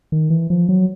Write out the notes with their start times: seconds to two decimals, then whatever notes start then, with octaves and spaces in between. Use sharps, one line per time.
0.12 D#3
0.30 E3
0.50 F3
0.69 F#3